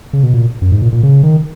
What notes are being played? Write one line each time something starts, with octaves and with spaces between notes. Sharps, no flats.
C#3
B2
A#2
F#2
G#2
A#2
A#2
C#3
D#3